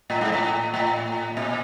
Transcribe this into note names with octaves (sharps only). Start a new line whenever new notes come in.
A2
G#2
A2
A2
A#2